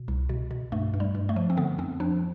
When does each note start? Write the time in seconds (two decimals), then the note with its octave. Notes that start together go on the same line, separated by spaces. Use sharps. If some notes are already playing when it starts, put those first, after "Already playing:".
Already playing: B2
0.08 C2
0.29 B2
0.51 B2
0.72 G2 A3
0.94 G2
1.00 G3
1.15 G2
1.29 A3
1.36 F3
1.50 C4
1.57 D3 B3
1.78 F2 C4
2.00 F3 D4